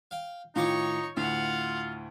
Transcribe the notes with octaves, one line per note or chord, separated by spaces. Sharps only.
F5 G5
A2 D#3 D#4 F4 C#5 G#5 C#6 D6
D2 A2 E4 F4 F5 F#5